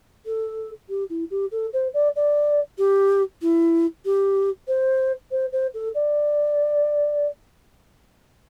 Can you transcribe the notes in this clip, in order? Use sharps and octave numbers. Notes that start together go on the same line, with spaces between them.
A4
G4
E4
G4
A4
C5
D5
D5
G4
E4
G4
C5
C5
C5
A4
D5